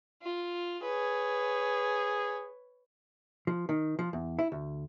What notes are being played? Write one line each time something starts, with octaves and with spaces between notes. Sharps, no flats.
F4
G#4 B4 C#5
F3
D#3
F3
E2
E4
D2